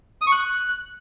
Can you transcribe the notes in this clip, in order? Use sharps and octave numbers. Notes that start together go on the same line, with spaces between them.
D#6
C#6
F#6